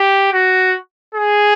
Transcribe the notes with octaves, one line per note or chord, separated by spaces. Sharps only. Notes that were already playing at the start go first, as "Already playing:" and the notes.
Already playing: G4
F#4
G#4